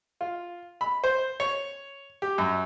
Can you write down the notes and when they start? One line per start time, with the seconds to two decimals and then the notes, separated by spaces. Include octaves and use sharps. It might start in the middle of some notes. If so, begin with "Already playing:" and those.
0.21 F4
0.81 B5
1.04 C5
1.40 C#5
2.22 G4
2.38 F#2